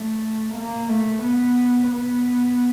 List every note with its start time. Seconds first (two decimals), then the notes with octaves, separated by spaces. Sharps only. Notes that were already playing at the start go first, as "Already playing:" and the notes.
Already playing: A3
0.55 A#3
0.89 A3
1.23 B3
1.91 B3